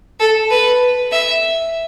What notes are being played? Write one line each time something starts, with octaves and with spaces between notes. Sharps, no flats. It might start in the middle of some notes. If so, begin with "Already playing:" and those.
A4
B4
E5